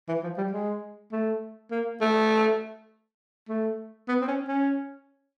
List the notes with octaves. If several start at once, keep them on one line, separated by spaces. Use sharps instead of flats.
E3
F3
G3
G#3
A3
A#3
A3
A3
B3
C4
C#4
C#4